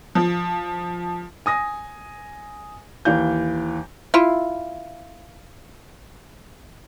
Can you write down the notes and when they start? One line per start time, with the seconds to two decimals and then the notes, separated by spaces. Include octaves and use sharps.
0.15 F3
1.46 G#5 D#6 A#6
3.05 D#2 E3 F5 G6
4.14 E4 F4